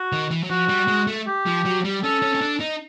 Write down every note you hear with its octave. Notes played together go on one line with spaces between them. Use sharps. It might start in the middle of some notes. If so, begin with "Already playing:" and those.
Already playing: F#4
D#3
E3
F#3
F3 F#4
G3
G#3
A3
G4
F3
F#3
G3
C#4 A4
C#4
C#4
D4
D#4